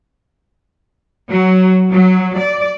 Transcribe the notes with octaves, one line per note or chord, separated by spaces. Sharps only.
F#3
F#3
D5